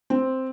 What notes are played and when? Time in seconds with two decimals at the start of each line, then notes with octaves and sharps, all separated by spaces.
0.10 C4